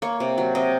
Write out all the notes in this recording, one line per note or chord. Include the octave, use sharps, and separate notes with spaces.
A#3 C#5
C3
F#3
C3 D#5